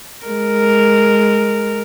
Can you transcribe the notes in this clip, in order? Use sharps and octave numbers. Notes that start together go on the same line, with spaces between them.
G#3 A#4